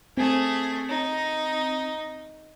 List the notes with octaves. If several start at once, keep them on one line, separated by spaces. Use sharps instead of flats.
A3 C4 G#4
D#4